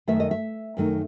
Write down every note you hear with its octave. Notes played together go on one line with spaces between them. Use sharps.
F#2 D#3 A3 E5
D#5
E5
F#2 D#3 A3